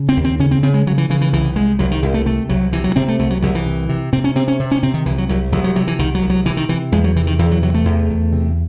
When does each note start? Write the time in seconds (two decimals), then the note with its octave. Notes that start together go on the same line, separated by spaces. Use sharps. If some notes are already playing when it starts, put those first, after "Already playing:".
Already playing: C#3
0.09 C4
0.17 D#2
0.25 C4
0.39 C#3 C#4
0.51 C4
0.62 C#3 C4
0.74 G#3
0.87 C#3 F#3
0.98 E3
1.10 C#3 E3
1.21 E3
1.33 C2 E3
1.56 C2 G#3
1.79 C2 F#3
1.91 D#3
2.02 C2
2.14 A3
2.26 C3 A3
2.49 C2 F#3
2.73 C3 E3
2.84 F#3
2.96 C3 C4
3.08 A3
3.19 C2 A3
3.30 F#3
3.42 C2 F#3
3.55 E3
3.66 C3
3.89 C3
4.13 C3 C4
4.24 C#4
4.35 C3 C4
4.48 C#4
4.59 C3
4.71 C#4
4.83 C3 C4
4.94 D#3
5.06 C2 E3
5.18 F#3
5.29 C2 F#3
5.52 C2 F#3
5.64 F#3
5.75 C3 F#3
5.87 E3
5.99 C2 D#3
6.15 F#3
6.22 C2
6.30 F#3
6.45 C3 E3
6.57 D#3
6.69 C3 E3
6.92 E2 G#3
7.04 F#3
7.16 C3 E3
7.27 D#3
7.39 E2 E3
7.51 F#3
7.62 C3 F#3
7.74 A3
7.85 E2
8.10 E2
8.32 C3